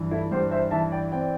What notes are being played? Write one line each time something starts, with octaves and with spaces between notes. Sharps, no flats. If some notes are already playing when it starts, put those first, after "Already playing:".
Already playing: G2 E3
E4 A4
G2 G4 C5
C5 E5
E3 E5 A5
D5 G5
C4 D5 G5